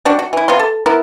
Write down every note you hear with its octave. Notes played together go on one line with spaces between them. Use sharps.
G3 D4 F#4
F#4
E3 E4
C3 B3 F4 C6
A4
B3 E4 A#4